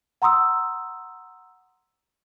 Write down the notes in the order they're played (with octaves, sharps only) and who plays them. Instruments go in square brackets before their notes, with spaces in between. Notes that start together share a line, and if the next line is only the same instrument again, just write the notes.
[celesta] F#5 A#5 C6 D#6 E6